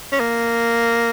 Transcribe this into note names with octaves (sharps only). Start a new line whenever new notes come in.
C#4
A#3